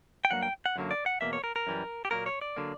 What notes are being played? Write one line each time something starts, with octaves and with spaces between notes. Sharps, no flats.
G5
G2 F#3 A#3 F#5
G5
F#5
F#2 D3 F#3 A#3
D5
F#5
E2 B2 A#3 E5
C#5
A#4
A#4
F#2 E3 G3
G4
A#2 F#3 A#3 A#4
C#5
D5
D3 F#3 A#3